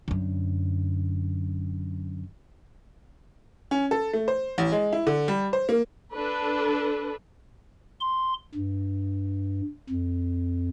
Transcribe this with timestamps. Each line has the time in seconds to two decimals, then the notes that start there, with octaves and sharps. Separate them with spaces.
0.08 F#2 D3
3.71 C#4
3.91 A4
4.13 A3
4.28 C5
4.58 A1
4.72 G#3
4.93 E4
5.07 D3
5.28 G3
5.53 C5
5.69 A#3
6.14 D4 A4 B4
8.00 C6
8.55 G2
9.89 F2